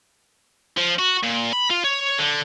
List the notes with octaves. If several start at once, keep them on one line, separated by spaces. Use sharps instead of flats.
F3
F#4
A#2
B5
F4
C#5
D3